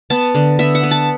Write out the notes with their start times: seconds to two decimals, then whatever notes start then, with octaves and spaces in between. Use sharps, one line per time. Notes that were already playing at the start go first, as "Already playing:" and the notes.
0.10 B3 A5
0.35 D3
0.59 B3 E5
0.75 F#5
0.83 B3
0.91 A5